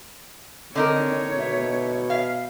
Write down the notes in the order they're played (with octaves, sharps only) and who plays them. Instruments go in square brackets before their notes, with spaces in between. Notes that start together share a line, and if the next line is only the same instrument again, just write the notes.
[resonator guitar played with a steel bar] D3 D#4 A#4 [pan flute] C4 [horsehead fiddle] C#5
[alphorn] B2 [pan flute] E5
[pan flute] E5 [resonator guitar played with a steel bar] F5